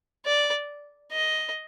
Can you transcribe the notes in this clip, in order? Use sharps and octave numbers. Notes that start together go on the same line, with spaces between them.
D5
D#5